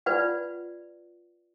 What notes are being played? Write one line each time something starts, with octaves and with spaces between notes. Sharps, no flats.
F4 B4 D5 F#5